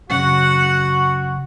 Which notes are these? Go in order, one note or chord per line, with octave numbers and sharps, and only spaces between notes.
F#2 C#3 F#4 F#5